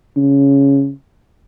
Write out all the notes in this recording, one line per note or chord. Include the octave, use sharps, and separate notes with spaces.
C#3